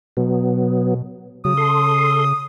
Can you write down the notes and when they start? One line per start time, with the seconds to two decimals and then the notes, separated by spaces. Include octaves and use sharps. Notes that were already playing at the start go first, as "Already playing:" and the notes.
0.17 B2 F#3 B3
1.45 C#3 F#3 D#6
1.57 A4 C6